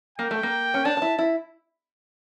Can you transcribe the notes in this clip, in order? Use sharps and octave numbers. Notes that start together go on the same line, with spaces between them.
A#3 G5
A3
A#3
C#4
D4 A5
D4
E4
E4